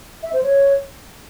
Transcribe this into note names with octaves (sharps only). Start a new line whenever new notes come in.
E5
C5
C#5